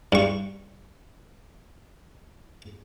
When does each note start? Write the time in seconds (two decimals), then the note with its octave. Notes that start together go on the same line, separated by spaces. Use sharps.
0.12 G2 C#6